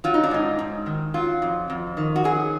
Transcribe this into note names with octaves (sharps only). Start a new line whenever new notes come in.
F#3 F4
D#4
D4
G#2 D#4
G#2
D#3
F#3 F4
F2
F2
D#3
F#4
F#3 G#4